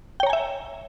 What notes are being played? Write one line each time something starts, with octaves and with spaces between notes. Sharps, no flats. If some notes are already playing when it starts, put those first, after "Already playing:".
C#5 E5 G5 G#5 A#5